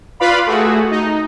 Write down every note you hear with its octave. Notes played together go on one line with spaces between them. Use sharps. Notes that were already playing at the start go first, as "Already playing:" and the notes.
F4 B4 D5 F5 B5
A3 F#4 G#4
D#4